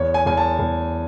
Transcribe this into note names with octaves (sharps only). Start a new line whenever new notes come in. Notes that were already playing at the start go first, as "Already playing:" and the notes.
Already playing: E2 C#5
G#5
E2 G#5
A5
E2